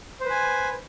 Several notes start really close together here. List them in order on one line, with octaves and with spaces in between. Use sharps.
C5 B4 G#5